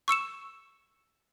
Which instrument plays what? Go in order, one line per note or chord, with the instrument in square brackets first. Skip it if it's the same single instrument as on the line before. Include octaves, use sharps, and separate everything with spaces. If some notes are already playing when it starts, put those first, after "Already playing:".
[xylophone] C#6 E6 C#7 E7